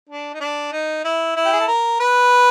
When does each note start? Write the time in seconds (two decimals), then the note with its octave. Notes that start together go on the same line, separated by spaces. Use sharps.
0.09 D4
0.34 D#4
0.40 D4
0.72 D#4
1.04 E4
1.36 E4
1.45 G4
1.53 G#4
1.60 A4
1.68 A#4
2.00 B4